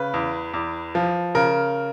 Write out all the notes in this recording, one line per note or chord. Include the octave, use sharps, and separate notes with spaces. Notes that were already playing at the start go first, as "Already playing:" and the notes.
Already playing: C#3 B4
E2
E2
F3
C#3 A#4